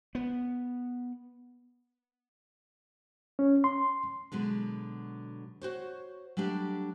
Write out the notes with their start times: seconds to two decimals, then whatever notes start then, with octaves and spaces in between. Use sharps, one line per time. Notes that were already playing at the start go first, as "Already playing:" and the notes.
0.15 B3
3.39 C#4
3.64 C6
4.32 B2 D3 F#3 G#3
5.62 F#4 C5 C#5
6.37 F#3 G3 A3 D4 G4